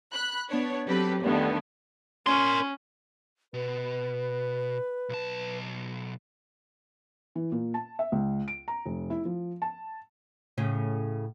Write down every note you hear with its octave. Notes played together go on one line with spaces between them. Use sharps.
B5 F#6
B3 D4 C#5
F#3 C4 G4 A4 B4
E2 G2 D3 D#3 A3 B3
C#4 A#4 C6
B2 B4
B1 A5
E3
A#2
A5
E5
C#2
D7
A#5
F1
E4
F3
A5
A2 C#3 C#4